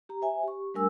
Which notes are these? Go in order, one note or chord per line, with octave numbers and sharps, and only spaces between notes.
G4 A#5
C5 E5 G#5
G4 C#6
G3 A3 D4 A#4 G#5 E6